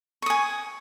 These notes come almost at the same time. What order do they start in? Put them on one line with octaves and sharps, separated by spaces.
C#6 D#6 G#5